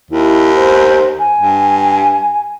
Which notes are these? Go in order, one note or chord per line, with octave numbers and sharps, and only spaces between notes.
D#2 E4
C5
G#5
G2